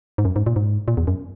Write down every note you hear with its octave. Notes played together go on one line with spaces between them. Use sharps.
G#2
F#2
G#2
A#2
G#2
A#2
E2
F#2